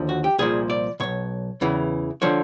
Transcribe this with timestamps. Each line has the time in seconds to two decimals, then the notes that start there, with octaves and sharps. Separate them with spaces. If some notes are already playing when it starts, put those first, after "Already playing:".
Already playing: D#2 D3 F3
0.09 F#4
0.24 G4
0.39 C2 A#2 F3 G#4
0.70 D5
1.00 B1 B2 C#5
1.61 E2 C#3 E3
2.22 D3 F3 C#5